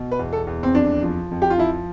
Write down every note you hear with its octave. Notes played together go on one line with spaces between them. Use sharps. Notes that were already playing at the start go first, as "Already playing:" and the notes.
Already playing: B2
B4
E2
A4
E2
C4
F2 D4
F3
F2
G4
F4
F3 E4